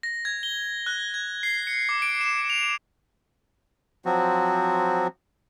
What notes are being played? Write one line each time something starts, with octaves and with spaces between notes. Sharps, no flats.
A#6
G#6
G7
F#6
G#6
C7
C#7
D6
D7
E7
F7
F3 F#3 C4 F#4